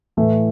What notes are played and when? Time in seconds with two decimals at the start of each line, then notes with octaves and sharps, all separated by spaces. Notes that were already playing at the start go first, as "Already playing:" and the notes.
0.17 A2 E3 A3